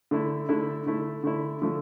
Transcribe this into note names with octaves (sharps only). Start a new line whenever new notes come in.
D3 A3 E4
D3 A3 E4
D3 A3 E4
D3 A3 E4
D3 F3 A3